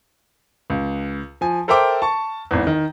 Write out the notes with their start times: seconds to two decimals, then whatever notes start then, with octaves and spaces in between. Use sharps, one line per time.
0.70 C#2
1.41 F3 G#5
1.68 A4 A#4 C5 E5 G5 D6
2.02 A5 C#6
2.51 G#1 E2
2.67 D#3